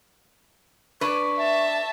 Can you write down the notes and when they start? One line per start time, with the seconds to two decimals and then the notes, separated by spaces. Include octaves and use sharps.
1.01 D4 B4 C#6
1.37 E5 A5